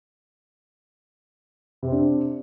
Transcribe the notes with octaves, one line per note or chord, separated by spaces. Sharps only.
C3 C4 D4